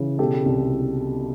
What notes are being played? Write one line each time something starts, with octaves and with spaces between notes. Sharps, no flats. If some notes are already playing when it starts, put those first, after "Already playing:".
Already playing: C#3 E3
B2 G4 A4
C2